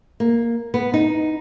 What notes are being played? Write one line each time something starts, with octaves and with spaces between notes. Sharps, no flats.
A#3
B3
D#4